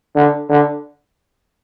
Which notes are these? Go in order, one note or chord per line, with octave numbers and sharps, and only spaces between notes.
D3
D3